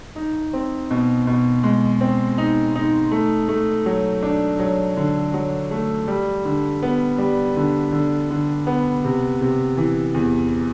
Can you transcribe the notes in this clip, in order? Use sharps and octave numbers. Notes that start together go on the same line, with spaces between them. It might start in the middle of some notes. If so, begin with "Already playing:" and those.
D#4
C4
B2
B2
G#3
C4
D#4
D#4
A3
A3
F#3
D4
F#3
D3
F#3
A3
G3
D3
B3
G3
D3
D3
D3
B3
C3
C3
E3
E2